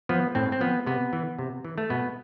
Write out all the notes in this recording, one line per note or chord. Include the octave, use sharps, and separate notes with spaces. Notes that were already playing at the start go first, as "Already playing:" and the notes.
F3 B3
A2 C4
C4
F3 B3
C3 B3
E3
C3
E3
A3
B2 B3